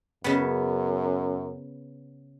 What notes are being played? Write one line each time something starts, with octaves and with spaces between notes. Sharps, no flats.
F#2 C#3 B3